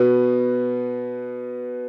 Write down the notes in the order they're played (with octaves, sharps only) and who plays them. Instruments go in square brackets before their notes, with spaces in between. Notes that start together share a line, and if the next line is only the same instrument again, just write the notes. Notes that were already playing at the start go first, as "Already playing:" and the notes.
Already playing: [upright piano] B2 B3